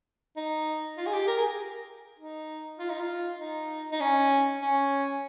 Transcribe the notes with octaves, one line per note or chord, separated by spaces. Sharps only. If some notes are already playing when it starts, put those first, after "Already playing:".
D#4
F4
G#4
G4
A#4
G#4
D#4
F4
D#4
F4
D#4
D#4
C#4
C#4